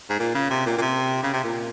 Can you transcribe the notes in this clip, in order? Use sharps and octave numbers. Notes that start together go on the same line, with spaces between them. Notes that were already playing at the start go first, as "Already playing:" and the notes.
G#2
A#2
C#3
C3
A#2
A#2
C3
C#3
C3
A#2